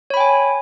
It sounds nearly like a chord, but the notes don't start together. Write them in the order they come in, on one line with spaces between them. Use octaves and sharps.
C#5 B5 G5 G#5